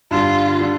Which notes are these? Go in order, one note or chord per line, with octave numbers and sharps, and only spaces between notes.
G2 D3 G3 F4
D3 G3